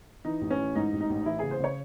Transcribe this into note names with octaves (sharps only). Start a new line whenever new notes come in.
E3 D#4
A1
C#4
E3
G#2 D#4
A1
D#4
A1
E3 E4
C#3 G#4
C5
C#3 C#5